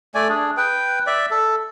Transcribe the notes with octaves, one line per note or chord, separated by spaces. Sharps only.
A3 D5 G#5
D4 G#4
B4 G5
D5 E5
A4